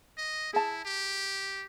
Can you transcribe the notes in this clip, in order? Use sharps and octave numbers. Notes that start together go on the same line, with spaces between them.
D#5
E4 G#4 A5
G4